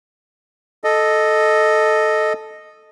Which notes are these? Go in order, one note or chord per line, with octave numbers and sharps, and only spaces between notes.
A4 D#5